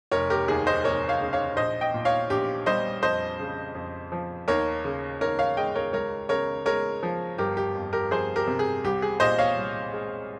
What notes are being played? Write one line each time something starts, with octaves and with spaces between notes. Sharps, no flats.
F1 A#4 C#5
G4 A#4
D#2 G#4
C5 D#5
F1 A#4 C#5
C#5 F5
C#3
C#5 F5
A#1 C5 D#5
D#5 G5
A#2
C#5 F5
A#1 G4
G3 C5 D#5
F2 C5 D#5
C#3
F2
F3
D#2 A#4 C#5
C#3
D#2 A#4 C#5
C#5 F5
G#3 D#5 G5
A#4 C#5
C#2 A#4 C#5
C#3 A#4 C#5
G#3 A#4 C#5
F3
G1 G4 A#4
G4
F2
G4 A#4
F3 G#4 C5
G4 A#4
C3
G#4
C2 G4
G#4
A#2 C5 D#5
C#5 F5
C2
G#3